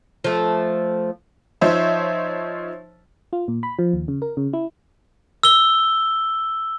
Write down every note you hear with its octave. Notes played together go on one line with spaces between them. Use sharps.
F3 A3
F3 D#4 C5 C#5 E5
F4
A#2
B5
F3
D#2
C#3
A#4
C#3
E4
E6 G7